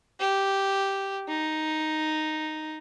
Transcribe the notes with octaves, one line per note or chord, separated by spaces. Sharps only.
G4
D#4